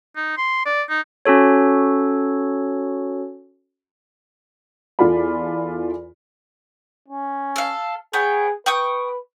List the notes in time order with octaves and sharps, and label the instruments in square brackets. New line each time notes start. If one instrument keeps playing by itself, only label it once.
[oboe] D#4
C6
D5
D#4
[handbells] C#4 F#4 A4 C#5
[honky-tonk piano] E2 F4 A4 D5 B5
[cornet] C#4
[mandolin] A4 F5
[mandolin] B3 C#5 G5 [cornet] G#4
[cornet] B4 [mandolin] G5 C#6 D#6